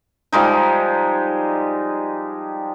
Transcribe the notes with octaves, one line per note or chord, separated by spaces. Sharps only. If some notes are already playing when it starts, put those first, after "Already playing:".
F3 G3 G#3 D#4